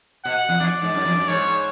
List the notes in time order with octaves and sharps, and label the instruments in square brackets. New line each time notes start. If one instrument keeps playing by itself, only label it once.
[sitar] B2 [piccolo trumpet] F#5
[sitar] E2
[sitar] E2 [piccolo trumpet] D5
[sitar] G#2
F#2
E2
F#2
[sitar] G#2 [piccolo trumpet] C#5